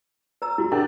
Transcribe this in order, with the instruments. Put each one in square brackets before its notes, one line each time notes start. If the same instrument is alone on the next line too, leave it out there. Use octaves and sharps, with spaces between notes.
[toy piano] B4 A#5 E6
[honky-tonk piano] G3 [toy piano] E4 F#4
[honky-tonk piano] D4 G4 [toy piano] A#4